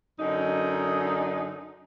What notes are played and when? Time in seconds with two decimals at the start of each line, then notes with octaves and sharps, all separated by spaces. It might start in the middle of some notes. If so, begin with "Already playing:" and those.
0.19 F#2 D3 D#4